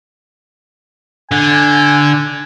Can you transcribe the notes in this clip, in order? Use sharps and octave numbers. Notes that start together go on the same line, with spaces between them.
D3 G#5